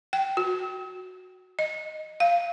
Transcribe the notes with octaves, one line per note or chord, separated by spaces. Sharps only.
G5
F#4
D#5
F5